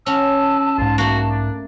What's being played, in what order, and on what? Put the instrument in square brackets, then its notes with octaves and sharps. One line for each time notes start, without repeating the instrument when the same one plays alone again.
[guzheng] C#4 F#4 [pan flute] A5 [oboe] E6
[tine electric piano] B1 G#2 [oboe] F4
[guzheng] A3 A#3 [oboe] F#4
[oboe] D4